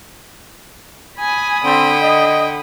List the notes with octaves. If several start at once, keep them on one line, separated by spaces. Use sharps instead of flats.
G#5 B5 D#6
D3 C4 G5
D#5